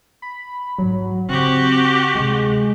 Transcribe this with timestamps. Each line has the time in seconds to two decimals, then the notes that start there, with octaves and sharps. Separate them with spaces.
0.22 B5
0.78 G#2 F#3 E4
1.29 C#3 C4 F#4 G4
2.15 D2 C3 G#3